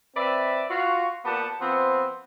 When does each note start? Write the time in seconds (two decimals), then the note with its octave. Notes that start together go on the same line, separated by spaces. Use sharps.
0.16 C4 B4 D5 E5
0.70 F4 F#4
1.25 A#2 B3 G4 F#5 A5
1.61 F3 B3 C4